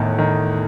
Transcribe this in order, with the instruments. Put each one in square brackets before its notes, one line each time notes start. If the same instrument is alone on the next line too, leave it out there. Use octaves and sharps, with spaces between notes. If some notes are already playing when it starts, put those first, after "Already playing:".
Already playing: [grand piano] E2 D#3 [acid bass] A2
[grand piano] D#3